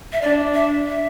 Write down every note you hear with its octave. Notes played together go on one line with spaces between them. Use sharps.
E5
D4 D5
E5
E5